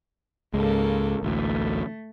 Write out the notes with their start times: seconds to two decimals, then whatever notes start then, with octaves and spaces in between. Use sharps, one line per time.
0.54 C#2 G#2 G#3 A#3 A4
1.23 A1 D2 A3